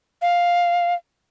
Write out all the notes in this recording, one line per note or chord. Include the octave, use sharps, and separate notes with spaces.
F5